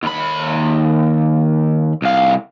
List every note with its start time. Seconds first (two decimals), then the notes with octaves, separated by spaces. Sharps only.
0.03 D#2 B5
2.02 C2 F5